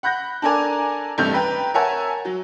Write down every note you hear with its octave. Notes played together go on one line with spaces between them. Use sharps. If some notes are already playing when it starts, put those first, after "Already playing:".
F#5 B5 F#6 G6 A#6
D4 A4 A#4 D5 G#5 A#5
A1 G2 C3 A3 G6 F7
B4 G5 A#5
A#4 C#5 E5 F#5 G#5 A5
F#3